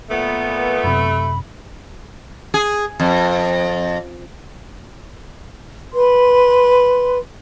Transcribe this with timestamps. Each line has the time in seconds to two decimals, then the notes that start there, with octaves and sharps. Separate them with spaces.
0.10 A#2 A3 B3
0.84 F#2 C3 B5
2.54 G#4
3.00 F2
5.93 B4 C6